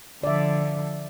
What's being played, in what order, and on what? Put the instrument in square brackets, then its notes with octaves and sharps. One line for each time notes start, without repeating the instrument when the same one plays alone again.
[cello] D3 F3 [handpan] D5 E5